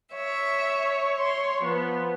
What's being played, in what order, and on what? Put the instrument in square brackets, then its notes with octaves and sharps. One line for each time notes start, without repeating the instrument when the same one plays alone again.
[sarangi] C#5 [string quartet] E5
[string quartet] C6
[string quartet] F3 [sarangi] B3